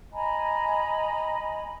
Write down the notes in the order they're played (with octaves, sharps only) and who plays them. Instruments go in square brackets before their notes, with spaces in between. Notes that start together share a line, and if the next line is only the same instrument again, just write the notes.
[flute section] D#5 G#5 A#5 B5